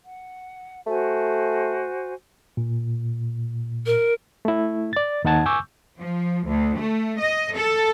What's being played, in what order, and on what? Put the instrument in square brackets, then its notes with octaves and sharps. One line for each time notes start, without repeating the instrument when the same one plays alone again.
[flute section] F#5
[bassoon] A3 [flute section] F#4 C5 G#5
[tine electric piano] A#2
[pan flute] A#4
[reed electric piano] A3 E4
D5 A6
D#2 D#4 F#5 A5 G#6
G#5 C#6 D6 E6 G6
[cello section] F3
D2
A3
D#5
A4